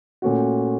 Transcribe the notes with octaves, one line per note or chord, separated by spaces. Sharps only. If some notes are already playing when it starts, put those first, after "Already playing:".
A#2 A3 C#4 F#4